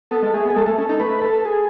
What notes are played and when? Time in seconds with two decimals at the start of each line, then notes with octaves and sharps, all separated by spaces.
0.11 B3 A4
0.22 G#3
0.33 A3 G#4
0.45 B3
0.50 G#4
0.56 G#3 A4
0.66 A3 A4
0.78 C#4 A4
0.89 D#4 A4
1.00 A3 B4
1.22 A4
1.45 G#4